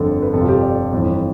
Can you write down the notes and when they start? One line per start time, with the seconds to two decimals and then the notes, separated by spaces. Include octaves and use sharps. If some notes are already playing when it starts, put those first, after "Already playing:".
Already playing: G1 F2 D3 A4
0.22 B4
0.34 G1 F2 C3 A4
0.41 F4
0.48 G4
0.63 D5
0.92 G1 F2 E3